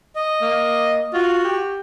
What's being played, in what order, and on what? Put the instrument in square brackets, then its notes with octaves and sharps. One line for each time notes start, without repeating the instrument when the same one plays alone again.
[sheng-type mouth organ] D#5
[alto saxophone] A#3
[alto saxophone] F4 [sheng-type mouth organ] F#4
[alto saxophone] G4